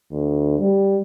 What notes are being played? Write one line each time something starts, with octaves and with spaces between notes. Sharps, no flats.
D2
G3